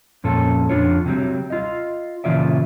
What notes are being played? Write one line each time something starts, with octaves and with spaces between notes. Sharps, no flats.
F2 A#2 C#4 A4
F2 D4 F4 C#5
C3 F#3 G3
F4 D#5
A#2 C#3 E3 F4 D5 E5